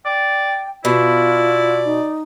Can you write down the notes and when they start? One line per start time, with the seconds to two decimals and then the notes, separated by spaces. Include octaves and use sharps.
0.06 D5 G5
0.85 B2 E4 F4 D5
1.85 D#4